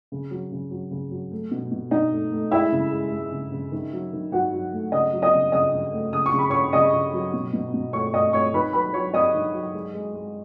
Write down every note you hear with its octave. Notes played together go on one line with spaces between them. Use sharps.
C#3
F#3
C#3
F#3
C#3
F#3
A3
B2
B2
B2 D#4 D#5
A3
A3
G#3 E4 E5
C#3
G#3
G#3
C#3
C#3
D#3
F#3
D#3
D#3 F#4 F#5
F#3
A3
C#3 D#5 D#6
F#3
D#5 D#6
C#3
C#3 D#5 D#6
C#3
A3
C#3 D#6
C#6
C#3 B5
C#3 C#5 C#6
C#3 D#5 D#6
C#3
F#3
B2
B2
B2
A3 C#5 C#6
A3 D#5 D#6
A3 C#5 C#6
D#3 B4 B5
F#3 B4 B5
F#3 C#5 C#6
F#3 D#5 D#6
D#3
F#3
G#3
G#3
G#3